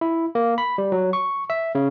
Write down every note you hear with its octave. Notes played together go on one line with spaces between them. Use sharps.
E4
A#3
B5
G3
F#3
C#6
E5
C#3